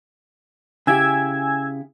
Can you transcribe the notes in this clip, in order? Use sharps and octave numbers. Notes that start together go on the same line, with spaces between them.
C#3 E4 G4 G#5 E6 G#6